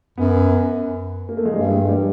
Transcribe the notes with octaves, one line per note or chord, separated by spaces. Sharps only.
F#2 B3
A#3
A3
G#3
G2 G3
G#3
G3